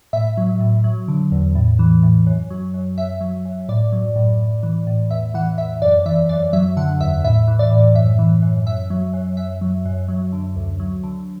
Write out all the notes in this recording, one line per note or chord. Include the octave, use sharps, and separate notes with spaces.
A2 E5
F#3
A2
F#3
D3
E2
A2
E3
A2
F#2
F#3
F#2
F#2 E5
F#3
F#2
A2 D5
F#3
A2
A2
E3
A2
E2 E5
E3 F#5
E2 E5
F#2 D5
E3 E5
F#2 D5
F#3 E5
D3 F#5
E2 E5
A2 E5
E3
D5
A2
F#2 E5
E3
F#2
F#2 E5
F#3
F#2
F#2 E5
F#3
F#2
F#3
D3
D2
F#3
D3